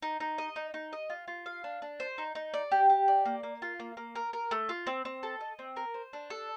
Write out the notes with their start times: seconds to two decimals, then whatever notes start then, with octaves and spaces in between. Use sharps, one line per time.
0.03 D#4
0.20 D#4
0.38 D#5
0.56 D#4
0.74 D#4
0.93 D#5
1.10 F4
1.28 F4
1.46 F5
1.64 D4
1.82 D4
2.00 C5
2.18 D#4
2.35 D#4
2.54 D5
2.72 G4
2.90 G4
3.08 D5
3.25 A#3
3.43 A#3
3.62 F4
3.80 A#3
3.97 A#3
4.15 A#4
4.33 A#4
4.51 A3
4.69 F4
4.87 C4
5.05 C4
5.23 A4
5.41 D#5
5.59 C4
5.77 A#4
5.94 C5
6.13 D4
6.30 A4